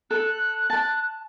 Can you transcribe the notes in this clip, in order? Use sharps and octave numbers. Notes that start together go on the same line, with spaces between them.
A4 F#6
A5